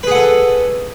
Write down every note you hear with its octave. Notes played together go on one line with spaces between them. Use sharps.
G#4 A4 B4 F#5